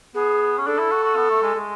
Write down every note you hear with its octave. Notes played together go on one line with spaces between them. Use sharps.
B3 G#4
C#4
D4 A4
E4
F#4
F#4
B3
A3
G#3
G#3